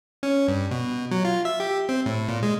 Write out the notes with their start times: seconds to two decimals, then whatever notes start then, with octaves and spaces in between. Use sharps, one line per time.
0.23 C#4
0.48 G2
0.71 B2
1.11 F#3
1.25 F4
1.45 E5
1.60 G4
1.89 C4
2.06 A2
2.28 A#2
2.42 G#3